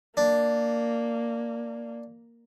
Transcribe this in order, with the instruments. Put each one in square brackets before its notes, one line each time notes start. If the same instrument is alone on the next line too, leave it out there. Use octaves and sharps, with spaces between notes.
[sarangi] A#3 [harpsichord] D4